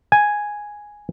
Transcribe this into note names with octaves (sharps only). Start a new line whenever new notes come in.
G#5